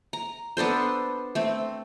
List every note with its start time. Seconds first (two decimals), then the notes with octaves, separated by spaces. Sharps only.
0.13 A#5
0.57 B3 D4 A4 C5
1.35 A3 C4